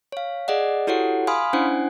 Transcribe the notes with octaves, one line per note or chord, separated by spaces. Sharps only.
C#5 F5
G#4 D5 D#5 F#5
E4 F#4 G4 A4 C#5 F#5
F5 G#5 B5 C6 D#6 F6
C#4 D4 E4 C5 F#5 G#5